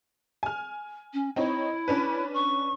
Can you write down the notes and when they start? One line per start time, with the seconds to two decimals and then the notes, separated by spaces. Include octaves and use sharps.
0.43 G#5 F6
1.13 C#4
1.36 C4 D#4 E4 C#5
1.88 C#4 D4 B4
2.34 C#6